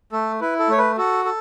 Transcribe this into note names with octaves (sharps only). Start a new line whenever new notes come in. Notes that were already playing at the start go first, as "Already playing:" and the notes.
A3 A4
E4 B4
A4
A3 C#5
B4
F#4 A4
A4